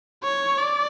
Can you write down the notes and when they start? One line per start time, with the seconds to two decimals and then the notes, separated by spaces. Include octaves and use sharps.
0.24 C#5
0.58 D5